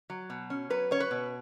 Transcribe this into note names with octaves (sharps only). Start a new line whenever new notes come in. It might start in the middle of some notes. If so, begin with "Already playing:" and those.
F#3
B2
C#4
F#3 B4
C#4 C#5
B4
B2